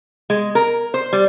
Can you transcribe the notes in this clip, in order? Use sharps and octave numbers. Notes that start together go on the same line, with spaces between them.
G#3
A#4
C5
G3